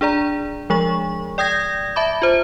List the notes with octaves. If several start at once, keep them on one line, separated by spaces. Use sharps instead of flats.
D4 G#4 D5 A#5
F3 G#3 G#4 C#6
D5 G5 D#6 G6 G#6 A#6
E5 A5 B5 D6
F4 C5